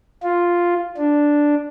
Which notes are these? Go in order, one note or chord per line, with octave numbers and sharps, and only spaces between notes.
F4
D4